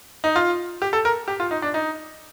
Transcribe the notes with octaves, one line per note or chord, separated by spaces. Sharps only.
D#4
F4
G4
A4
A#4
G4
F4
D#4
D4
D#4